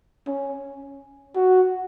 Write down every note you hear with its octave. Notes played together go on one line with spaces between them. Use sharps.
C#4
F#4